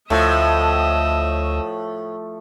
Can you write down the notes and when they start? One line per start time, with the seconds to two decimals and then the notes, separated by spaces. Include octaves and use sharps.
0.10 D2 A2 F3 A3 D#5 E5